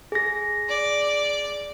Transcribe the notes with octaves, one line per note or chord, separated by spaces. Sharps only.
G#4 A#6
D5